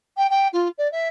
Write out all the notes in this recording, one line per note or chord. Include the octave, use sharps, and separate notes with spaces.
G5
G5
F4
D5
E5